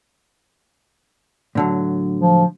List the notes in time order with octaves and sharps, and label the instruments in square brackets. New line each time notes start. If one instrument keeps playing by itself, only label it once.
[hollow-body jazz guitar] A2 D3 F#3
[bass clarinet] F3